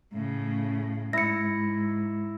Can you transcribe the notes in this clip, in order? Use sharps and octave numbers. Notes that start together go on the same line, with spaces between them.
A2 C#3
G#2 E4 A#6 C#7